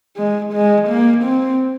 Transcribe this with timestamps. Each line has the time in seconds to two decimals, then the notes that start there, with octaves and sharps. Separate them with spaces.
0.17 G#3
0.53 G#3
0.89 A#3
1.24 C4